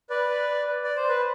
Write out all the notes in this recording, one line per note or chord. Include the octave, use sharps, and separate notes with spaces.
B4 D5
D5
C5
B4